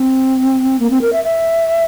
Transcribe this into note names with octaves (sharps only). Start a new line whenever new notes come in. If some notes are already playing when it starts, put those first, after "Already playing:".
Already playing: C4
A#3
C4
A#4
E5
E5